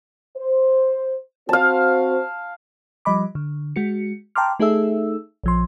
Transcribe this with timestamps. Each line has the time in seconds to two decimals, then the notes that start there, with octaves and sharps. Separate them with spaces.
0.37 C5
1.49 C4 F#4 C5 F5 A5
3.05 F3 G3 D#5 B5 D6
3.35 D3
3.76 G#3 F#4 C#7
4.36 G5 A5 A#5 C6 D6 F6
4.60 A3 D#4 G#4 A4 E5 E6
5.44 A#1 F3 C6